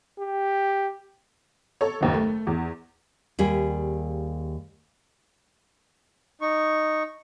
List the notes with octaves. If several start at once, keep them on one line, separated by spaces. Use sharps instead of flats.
G4
A4 C#5
F#1 D#2
A3
E2
D#2 G3 G#4
D#4 C#6